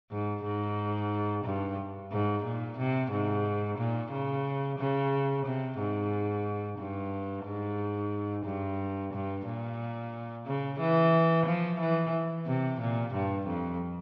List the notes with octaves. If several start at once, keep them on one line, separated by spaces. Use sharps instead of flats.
G#2
G#2
G2
G#2
A#2
C3
G#2
A#2
C#3
C#3
C3
G#2
G2
G#2
G2
G2
A#2
C#3
E3
F3
E3
C3
A#2
G2
F2